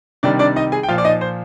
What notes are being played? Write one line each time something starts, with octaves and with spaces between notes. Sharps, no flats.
C3 D#3 G3 D4 D5
D4 D5
D#4 D#5
G#4 G#5
G5
A#2 F3 F4 F5
D5
D#4 D#5
C5